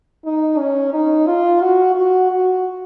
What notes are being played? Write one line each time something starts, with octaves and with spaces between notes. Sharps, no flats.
D#4
C#4
D#4
F4
F#4
F#4
F#4